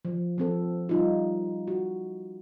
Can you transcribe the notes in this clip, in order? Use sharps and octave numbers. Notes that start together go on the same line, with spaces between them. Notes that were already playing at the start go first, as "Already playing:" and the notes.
F3
F3 C4 A4
G3 D#4 F4
F#4